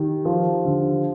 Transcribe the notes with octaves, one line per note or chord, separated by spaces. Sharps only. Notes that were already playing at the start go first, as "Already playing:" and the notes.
Already playing: D#3 G4
F3
D3